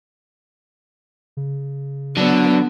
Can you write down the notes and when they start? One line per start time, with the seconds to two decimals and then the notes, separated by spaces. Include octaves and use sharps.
1.37 C#3
2.17 D3 F#3 B3 D4